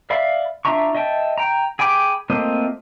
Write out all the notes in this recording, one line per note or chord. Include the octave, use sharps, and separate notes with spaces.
D5 E5 F5 B5
D4 F4 E5 A#5 C#6
D#5 E5 G5 A5
G5 A#5
G#4 G5 B5 D6
A3 A#3 C4 F4 D#5